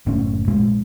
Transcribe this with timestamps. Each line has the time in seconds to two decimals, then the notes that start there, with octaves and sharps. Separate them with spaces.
0.06 F#1 A2 C#4
0.48 A#1 G#3